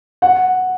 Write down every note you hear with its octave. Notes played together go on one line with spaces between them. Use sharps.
F#5